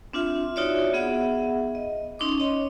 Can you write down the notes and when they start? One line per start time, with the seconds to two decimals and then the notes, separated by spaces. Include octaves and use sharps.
0.13 C4 D4 F4 E5
0.56 D#4 F4 F#4 C#5 D5 E5
0.94 B3 G#4 E5 F#5
1.75 D#5
2.19 C#4 D#4 C6 D6
2.40 C#5 D#5